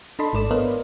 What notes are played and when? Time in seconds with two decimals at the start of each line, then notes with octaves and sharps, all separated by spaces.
0.19 D4 A4 D#5 A5 B5 C6
0.33 G#1 G#2 A4 D5 E7
0.51 B3 A#4 B4 C#5 D#5 F5